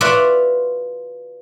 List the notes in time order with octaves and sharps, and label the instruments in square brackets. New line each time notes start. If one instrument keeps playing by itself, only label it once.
[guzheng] F4 F#4 B4 D5 E5 F#5